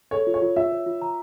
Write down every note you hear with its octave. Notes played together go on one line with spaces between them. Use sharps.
A4 C#5
F4
C#5
F4
F4 E5
C#5
F4
A#5